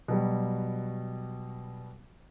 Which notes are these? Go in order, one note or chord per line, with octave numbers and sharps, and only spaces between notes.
B2 F#3 G3 G4